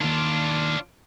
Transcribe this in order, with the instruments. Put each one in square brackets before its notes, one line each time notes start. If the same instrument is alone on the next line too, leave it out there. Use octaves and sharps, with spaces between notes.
[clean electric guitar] D#2 D#3 [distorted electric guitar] D4 F4